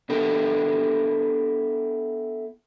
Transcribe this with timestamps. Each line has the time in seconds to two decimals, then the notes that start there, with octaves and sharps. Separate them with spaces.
0.10 B3 D4 E4 G4 A4 A#4